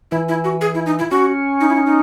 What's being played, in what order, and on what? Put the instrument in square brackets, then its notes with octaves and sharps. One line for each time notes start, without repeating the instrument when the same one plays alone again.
[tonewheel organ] E3 [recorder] E4
[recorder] E4
F#4
G#4
E4
D#4
E4
[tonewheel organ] C#4 [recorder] F#4
[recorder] D#4
E4
D#4
D#4